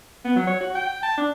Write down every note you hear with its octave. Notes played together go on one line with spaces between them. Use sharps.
B3
F#3
C#5
F#4
G5
A5
D4